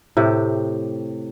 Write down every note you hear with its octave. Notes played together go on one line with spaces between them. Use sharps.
A2 C3 G4